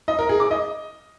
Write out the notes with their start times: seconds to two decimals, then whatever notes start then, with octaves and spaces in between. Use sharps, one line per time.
0.08 D#5
0.19 A#4
0.29 G#4
0.40 D6
0.51 D#5